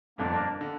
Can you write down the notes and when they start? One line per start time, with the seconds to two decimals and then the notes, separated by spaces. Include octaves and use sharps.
0.18 G1 F2 D3 A#3 D4
0.61 D3